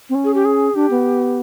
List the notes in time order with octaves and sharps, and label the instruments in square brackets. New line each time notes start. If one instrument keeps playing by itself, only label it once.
[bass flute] C4
C#4
[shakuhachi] G#4
G4
G#4
[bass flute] D4 [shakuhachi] G4
[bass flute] B3